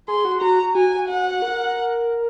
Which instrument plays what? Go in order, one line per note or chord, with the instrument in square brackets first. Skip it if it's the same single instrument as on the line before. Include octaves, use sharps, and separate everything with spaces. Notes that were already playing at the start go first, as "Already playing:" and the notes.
[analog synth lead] G#4 [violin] C6
[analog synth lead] F#4
[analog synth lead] F#4 [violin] A#5
[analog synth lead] F#4 [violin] G#5
[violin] F#5
[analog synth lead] A#4